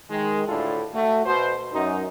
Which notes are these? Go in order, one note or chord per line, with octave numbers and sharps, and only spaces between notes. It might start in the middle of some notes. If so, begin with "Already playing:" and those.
D#3 G#3
D2 A2 D4 E4 F4 A4
A3 F#4
B2 C5
F#2 D#4